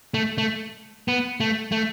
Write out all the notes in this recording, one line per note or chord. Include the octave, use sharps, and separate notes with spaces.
A3
A3
B3
A3
A3